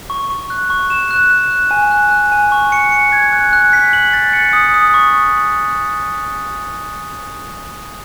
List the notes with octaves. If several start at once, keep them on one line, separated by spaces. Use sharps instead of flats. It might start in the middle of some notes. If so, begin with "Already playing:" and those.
C#6
C#6
F#6
C#6
E7
F#6
F#6
F#6
G#5
F#6
F#6
G#5
C#6
C#7
C#7
G#6
F#6
F#6
B6
F#7
A6
C#7
D#6
D#6
C#6